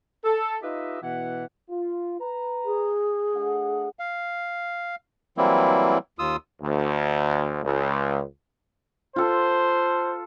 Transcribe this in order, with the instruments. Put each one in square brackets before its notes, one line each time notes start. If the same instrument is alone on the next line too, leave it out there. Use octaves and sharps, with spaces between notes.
[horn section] A4
D#4 F4 G4 B4 D#5 E5
B2 E3 F#5
[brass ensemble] F4
B4 A#5
[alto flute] G#4
[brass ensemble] A3 D4 F#5
[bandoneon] F5
E3 F#3 G3 A#3 C4 E4
D#2 F4 D#6 E6
[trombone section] D2
C#2
[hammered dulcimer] F4 A4 [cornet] C5